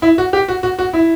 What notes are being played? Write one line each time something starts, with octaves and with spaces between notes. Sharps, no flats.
E4
F#4
G4
F#4
F#4
F#4
E4